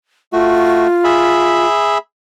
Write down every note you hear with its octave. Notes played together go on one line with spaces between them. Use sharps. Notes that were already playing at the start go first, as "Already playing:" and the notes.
A3 F4 F#4
G#4 E5 B5